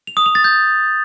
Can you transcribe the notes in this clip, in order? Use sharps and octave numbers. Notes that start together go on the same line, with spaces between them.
F7
D#6
F7
A6
G6